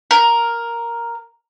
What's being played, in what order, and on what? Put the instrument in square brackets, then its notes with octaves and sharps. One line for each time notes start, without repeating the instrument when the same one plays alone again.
[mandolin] A#4